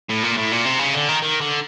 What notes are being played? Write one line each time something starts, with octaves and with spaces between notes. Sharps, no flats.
A2
A#2
A2
A#2
C3
C#3
D3
D#3
D#3
D3